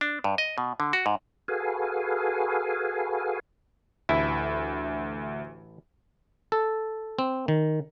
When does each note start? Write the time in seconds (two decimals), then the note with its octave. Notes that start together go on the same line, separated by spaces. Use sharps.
0.01 D4
0.24 G2
0.38 D#5
0.58 B2
0.80 D3
0.93 F#4
1.06 G#2
1.48 F#4 G#4 A4 B4 F5 G#5
4.09 A1 D2 E4 E5
6.52 A4
7.19 C4
7.48 D#3